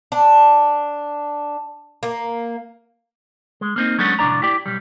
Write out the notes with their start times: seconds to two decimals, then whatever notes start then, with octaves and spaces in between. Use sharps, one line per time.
0.12 D4
2.03 A#3
3.61 G#3
3.76 A#3 C4 D#4
3.98 F#3 G#3 A3 B3 C#4 D4
4.19 C2 F2 A2 D4 D5 A#5
4.42 E4 G4 D5
4.66 B1 G3